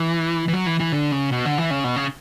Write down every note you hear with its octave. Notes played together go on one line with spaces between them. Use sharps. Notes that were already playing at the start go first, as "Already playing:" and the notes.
Already playing: E3
E3
F#3
E3
E3
D3
C#3
B2
D3
E3
C#3
B2
C#3